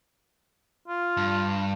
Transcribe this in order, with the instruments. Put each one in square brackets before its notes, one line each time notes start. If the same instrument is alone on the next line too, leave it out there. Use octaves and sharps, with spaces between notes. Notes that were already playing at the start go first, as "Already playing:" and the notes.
[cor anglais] F4
[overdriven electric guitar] G2